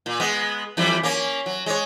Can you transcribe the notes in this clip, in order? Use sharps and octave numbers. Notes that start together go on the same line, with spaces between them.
A#2
G#3 B3
F2 E3 G3
A#3 C#4
F#3
G#3 C#5